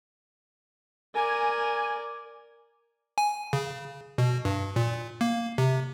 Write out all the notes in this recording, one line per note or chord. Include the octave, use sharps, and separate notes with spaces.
A#4 D5 G#5
G#5
C#3
B2
G2
A#2
A#3
C3